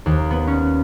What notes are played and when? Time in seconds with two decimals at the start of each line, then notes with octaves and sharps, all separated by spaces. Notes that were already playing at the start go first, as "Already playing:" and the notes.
0.06 D#2
0.31 B3
0.47 C#4